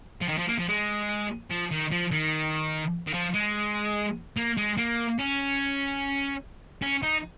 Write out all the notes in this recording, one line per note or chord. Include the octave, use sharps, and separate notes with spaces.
F3
D#3
F3
A#3
F3
G#3
F3
D#3
F3
D#3
D#3
F3
G#3
A#3
G#3
A#3
C#4
C#4
D#4